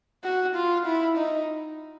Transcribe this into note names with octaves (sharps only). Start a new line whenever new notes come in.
F#4
F4
E4
D#4